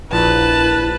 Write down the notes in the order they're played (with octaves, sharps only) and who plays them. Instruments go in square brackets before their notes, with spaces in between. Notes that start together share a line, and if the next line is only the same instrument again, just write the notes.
[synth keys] A#1 [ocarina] E4 [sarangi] B4 [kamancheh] A5 F#6